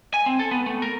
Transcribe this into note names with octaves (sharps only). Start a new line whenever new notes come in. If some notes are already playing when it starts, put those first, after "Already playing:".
G#5
C4
A4
B3
A3
A#4